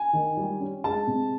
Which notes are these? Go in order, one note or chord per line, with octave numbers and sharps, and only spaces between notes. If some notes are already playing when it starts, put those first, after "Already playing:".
Already playing: G#5
D#3
G3
C#4
G#3 A5
C3